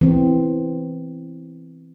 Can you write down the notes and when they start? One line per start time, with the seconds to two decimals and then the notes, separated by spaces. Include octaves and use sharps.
0.01 E3 C4